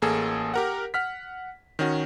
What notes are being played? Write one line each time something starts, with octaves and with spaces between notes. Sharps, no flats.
A1 A#3 G#4 A4
G4 A#4 F#5
F#5 F6 B6
D#3 C#4 F#4